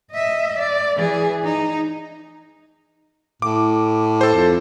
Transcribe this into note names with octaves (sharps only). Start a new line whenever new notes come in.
D#5 E5
D5
E3 G#4
D#4
A2 D6
A4 C5
F2